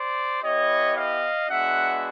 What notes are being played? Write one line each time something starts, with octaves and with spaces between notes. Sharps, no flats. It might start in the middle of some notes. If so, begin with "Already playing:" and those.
Already playing: C5 D5
B3 E4 G4 C#5 D#5
D#5 F5
G#3 B3 D4 F#4 E5 F#5